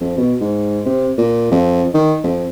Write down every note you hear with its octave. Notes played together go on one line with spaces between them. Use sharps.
F2
B2
G#2
C3
A#2
F2
D#3
F2